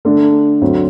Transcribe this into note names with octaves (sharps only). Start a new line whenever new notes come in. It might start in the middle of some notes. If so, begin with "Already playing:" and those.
D3 A3 D4
D2 D3 F#3 C4